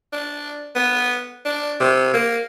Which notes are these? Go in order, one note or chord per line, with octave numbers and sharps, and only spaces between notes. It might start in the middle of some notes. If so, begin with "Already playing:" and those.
D4
B3
D4
C3
A#3